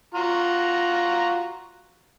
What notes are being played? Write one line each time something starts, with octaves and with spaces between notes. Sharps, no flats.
F4 F#4 A#5